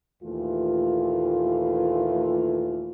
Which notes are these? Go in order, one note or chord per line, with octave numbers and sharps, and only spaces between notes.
D#2 A#2 E3 A3 F4